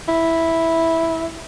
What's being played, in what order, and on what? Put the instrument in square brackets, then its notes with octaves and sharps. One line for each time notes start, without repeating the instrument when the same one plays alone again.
[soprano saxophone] E4